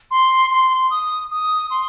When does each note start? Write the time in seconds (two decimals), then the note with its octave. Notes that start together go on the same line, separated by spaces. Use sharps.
0.11 C6
0.51 C6
0.90 D#6
1.31 D#6
1.70 C6